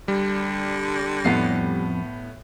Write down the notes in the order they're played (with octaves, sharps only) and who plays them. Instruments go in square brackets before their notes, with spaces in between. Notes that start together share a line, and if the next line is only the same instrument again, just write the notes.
[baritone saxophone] D3 [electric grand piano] G3
[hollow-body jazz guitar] F2 [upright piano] A2 B3 C7